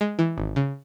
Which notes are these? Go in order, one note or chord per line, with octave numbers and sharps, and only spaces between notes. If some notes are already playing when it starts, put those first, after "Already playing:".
G#3
E3
G#1
C#3